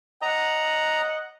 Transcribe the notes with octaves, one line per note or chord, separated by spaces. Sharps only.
D#5 F#5 A#5